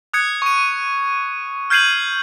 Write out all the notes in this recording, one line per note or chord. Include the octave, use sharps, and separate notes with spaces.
D#6 F#6 G#6 C#7
C#6 D#7
F6 G6 G#6 C7 D#7 F#7